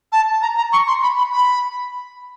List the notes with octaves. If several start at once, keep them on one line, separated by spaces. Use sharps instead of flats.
A5
A#5
A#5
C#6
C6
B5
B5
B5